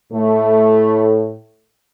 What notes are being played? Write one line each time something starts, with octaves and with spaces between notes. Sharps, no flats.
A2 A3